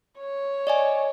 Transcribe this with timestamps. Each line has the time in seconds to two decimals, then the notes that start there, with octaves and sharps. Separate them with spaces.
0.19 C#5
0.67 D5 D#5 G#5